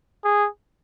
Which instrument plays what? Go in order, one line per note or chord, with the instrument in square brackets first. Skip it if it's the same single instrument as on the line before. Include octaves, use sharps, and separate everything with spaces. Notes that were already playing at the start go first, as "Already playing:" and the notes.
[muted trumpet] G#4